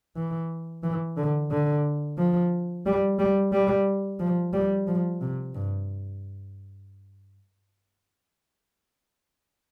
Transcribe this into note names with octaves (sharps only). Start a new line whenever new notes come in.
E3
E3
D3
D3
F3
G3
G3
G3
F3
G3
F3
C3
G2